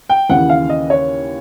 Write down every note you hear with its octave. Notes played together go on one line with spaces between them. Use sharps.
G5
D#2 C#3 E3 F#5
F5
D#5
C#5